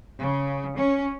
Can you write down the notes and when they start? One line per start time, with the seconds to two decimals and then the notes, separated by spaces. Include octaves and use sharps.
0.20 C#3
0.78 C#4